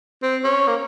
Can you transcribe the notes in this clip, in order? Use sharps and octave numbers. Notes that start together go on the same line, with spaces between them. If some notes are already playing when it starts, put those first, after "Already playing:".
C4
C#4
A#3